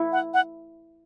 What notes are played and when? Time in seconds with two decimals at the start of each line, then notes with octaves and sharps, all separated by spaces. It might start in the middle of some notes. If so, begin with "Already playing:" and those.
Already playing: E4
0.12 F#5
0.34 F#5